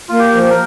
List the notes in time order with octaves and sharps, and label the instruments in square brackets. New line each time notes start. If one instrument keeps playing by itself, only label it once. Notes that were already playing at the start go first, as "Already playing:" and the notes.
[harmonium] A#3 [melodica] F4
[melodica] G4
[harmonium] F3
[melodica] G4
A#4